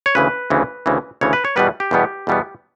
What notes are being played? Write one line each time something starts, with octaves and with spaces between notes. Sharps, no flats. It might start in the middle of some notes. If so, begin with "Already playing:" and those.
C#5
D2 C#3 E3 B4
D2 C#3 E3
D2 C#3 E3
D2 C#3 E3 C#5
B4
C#5
E2 B2 G3 B3 B4
G4
E2 B2 G3 B3
E2 B2 G3 B3